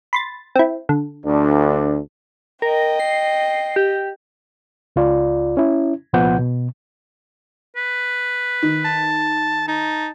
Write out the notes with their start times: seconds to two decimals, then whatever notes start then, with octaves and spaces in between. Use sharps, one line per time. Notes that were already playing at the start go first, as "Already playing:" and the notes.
0.13 B5 C6 A6
0.56 C4 E4
0.89 D3
1.26 D2 D4
2.62 A#4 D#5 G5
3.00 C7
3.76 G4
4.96 C#2 F4 D5
5.57 C#4 E4
6.13 C2 A#2 F3 B3 F#5 G6
6.38 B2
7.76 B4
8.62 D#3
8.85 A5
9.68 D#4 A5